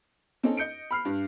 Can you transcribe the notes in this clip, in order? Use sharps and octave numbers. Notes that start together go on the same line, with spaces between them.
C4 C#4 D#4 A4
D#5 G6 C#7 D7
B5 F6 C7
G2